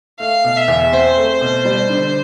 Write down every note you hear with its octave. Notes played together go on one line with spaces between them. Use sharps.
A3 F5
B2
E5
E2
C4 C5
A3
B2
G3
D3